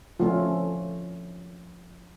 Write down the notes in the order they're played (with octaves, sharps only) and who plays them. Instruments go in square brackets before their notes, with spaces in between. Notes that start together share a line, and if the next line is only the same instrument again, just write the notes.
[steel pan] F3 A3 C#4 F4